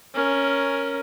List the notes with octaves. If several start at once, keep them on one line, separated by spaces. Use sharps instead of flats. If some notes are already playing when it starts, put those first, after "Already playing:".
C#4 A#4